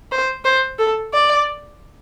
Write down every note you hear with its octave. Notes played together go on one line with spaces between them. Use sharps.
C5
C5
A4
D5